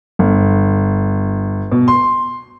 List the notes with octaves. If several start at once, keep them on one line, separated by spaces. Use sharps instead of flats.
G1
B2
C6